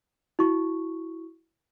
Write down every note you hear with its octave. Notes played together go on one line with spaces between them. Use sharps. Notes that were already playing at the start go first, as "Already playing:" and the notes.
E4 F#4 C#6